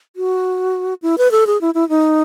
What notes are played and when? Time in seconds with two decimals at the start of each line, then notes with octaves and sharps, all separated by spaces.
0.16 F#4
1.02 E4
1.18 B4
1.31 A4
1.47 G#4
1.61 E4
1.75 E4
1.89 D#4